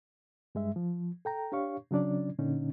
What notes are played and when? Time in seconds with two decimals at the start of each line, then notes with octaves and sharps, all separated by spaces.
0.55 G2 G#3 E5
0.76 F3
1.25 A4 G5 A#5
1.52 D4 G4 C#5 F5 C#6
1.91 C#3 F#3 C#4 D4 D5
2.39 A#2 D3 C#4 D#4